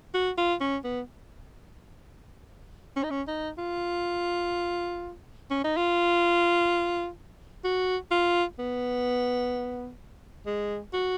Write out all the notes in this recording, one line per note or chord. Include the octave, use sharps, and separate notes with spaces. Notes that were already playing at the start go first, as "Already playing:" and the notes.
F#4
F4
C#4
B3
C#4
D#4
C#4
D#4
F4
C#4
D#4
F4
F#4
F4
B3
G#3
F#4